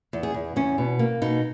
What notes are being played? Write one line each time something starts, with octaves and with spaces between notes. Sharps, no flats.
E2
G#4
E2
E2 C#4
B2
A#3
B2 D#4